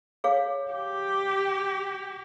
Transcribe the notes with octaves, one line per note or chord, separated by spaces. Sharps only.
G#4 C#5 F5
G4